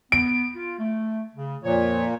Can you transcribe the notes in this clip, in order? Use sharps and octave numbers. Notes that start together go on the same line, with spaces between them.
B3 D7
F4
A3
C#3
F2 A#2 F3 C#5